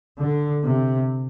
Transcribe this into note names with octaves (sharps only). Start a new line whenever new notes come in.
D3
C3